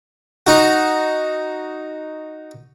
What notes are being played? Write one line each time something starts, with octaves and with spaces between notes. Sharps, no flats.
D#4 F#4